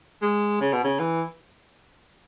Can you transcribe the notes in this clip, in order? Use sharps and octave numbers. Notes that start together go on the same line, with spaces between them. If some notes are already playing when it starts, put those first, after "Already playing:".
G#3
C#3
B2
C#3
E3